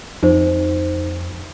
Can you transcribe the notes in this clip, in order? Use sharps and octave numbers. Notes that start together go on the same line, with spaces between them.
F2 D#4 C5